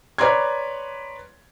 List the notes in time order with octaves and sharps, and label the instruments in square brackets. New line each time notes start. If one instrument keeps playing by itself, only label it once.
[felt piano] B4 C#5 D5 A#5 C6 G#6